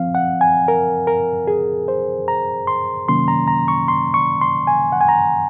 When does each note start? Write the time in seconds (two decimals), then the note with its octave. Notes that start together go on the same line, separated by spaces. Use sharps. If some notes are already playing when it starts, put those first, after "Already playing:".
Already playing: F3 C4 F5
0.15 F#5
0.41 G#5
0.68 A#4
1.07 A#4
1.47 G#4
1.88 C5
2.28 A#5
2.67 C6
3.08 C3 D#3 F#3 A#3 C#4 C6
3.28 A#5
3.48 A#5
3.68 C#6
3.88 C6
4.14 C#6
4.41 C6
4.67 G#5
4.92 F#5
5.01 G#5
5.09 A#5